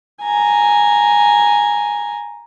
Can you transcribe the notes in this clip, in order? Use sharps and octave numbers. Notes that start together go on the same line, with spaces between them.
G#5 A#5